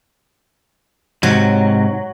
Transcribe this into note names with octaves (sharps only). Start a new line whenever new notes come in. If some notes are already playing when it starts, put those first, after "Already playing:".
G#2 C3 F#3